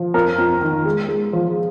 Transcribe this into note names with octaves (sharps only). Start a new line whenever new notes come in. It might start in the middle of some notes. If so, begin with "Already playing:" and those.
Already playing: F3
F2 A#4
F2
D#3
G#3
G#3
F3